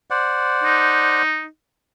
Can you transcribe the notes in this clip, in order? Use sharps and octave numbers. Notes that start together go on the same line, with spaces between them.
C5 D5 F#5
D#4